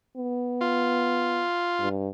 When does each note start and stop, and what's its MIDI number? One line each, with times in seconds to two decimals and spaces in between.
0.17 1.44 59
0.61 1.89 65
1.80 2.08 43